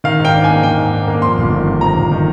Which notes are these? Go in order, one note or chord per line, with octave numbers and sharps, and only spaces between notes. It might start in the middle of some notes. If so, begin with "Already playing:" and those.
D#3 F5
G#2
G5
D4
A#3 G#5
D#3 G5
G#2
D4
A#3
F2 C6
G1
D#3
C3
F2 A#5
G1
D#3